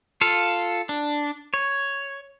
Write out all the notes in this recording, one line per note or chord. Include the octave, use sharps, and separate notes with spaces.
F4 A4 F5
D4
C#5